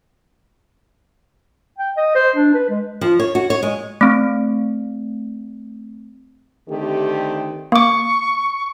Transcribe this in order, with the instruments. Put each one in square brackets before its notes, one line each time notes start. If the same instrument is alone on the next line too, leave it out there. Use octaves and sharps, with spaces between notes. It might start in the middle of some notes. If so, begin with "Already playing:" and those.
[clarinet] G5
D#5
C5
D4
B4
G#3
[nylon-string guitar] F3
C#5
F#4
C#5
G#3
[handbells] A3 C4
[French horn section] D3 D#3 A3 C4 G4
[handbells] A#3 D6 [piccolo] C#6